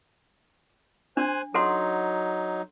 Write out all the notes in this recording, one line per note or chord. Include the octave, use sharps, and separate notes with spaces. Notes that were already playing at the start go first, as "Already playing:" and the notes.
D4 C5 G#5 F#6
F#3 D#4 A4 F#5 C6